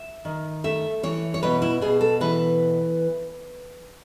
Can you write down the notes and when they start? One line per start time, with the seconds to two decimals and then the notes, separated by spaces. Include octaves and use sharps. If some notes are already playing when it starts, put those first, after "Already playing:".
Already playing: E5
0.25 D#3
0.64 A3 E5
1.03 E3 C#5
1.34 C#5
1.43 B2 B4
1.62 E4
1.81 B2 G#4
2.01 A4
2.21 E3 B4